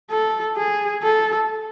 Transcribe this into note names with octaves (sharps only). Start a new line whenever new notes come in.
A4
G#4
A4